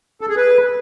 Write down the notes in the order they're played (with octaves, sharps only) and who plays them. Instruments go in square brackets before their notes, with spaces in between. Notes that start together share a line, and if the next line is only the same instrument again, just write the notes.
[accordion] A4
G#4
B4